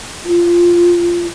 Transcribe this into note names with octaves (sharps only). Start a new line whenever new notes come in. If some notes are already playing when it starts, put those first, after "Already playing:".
F4